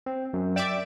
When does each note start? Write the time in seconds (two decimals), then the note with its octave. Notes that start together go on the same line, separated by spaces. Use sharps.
0.06 C4
0.33 F#2
0.56 D5 E5 G5 D6 D7